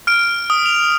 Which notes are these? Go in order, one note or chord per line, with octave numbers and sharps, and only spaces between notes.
F6 D7
D#6
F7